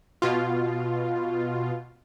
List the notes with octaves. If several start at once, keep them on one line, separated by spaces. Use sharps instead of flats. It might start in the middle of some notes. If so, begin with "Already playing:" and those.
B2 F4